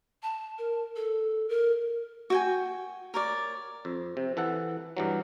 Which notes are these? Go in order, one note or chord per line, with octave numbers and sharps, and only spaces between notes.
A5
A#4
A4
A#4
F#4 G5 G#5
A#4 C#5 D5
F2
C3
E3 A4 F#5
G2 E3 F#3